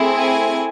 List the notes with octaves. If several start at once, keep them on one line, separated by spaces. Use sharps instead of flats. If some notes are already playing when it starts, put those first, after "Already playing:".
Already playing: A3 C4 E4 G#4
G#5